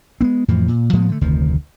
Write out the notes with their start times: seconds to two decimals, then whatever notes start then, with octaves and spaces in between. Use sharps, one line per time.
0.21 G#3 B3 C4
0.48 F2 A2 E3 F3
0.68 A#2
0.93 A2 F3 G#3 B3
1.09 D3 A3
1.21 F1 D2 D#3 F3